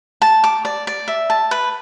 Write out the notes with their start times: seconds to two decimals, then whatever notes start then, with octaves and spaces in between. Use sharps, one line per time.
0.22 A5
0.44 D6
0.65 D5
0.87 D5
1.08 E5
1.30 A5
1.51 B4